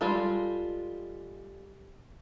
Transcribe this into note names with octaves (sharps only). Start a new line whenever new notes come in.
G3 G#3 F4 A4